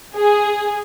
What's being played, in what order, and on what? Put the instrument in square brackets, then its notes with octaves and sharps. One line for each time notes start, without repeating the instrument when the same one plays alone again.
[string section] G#4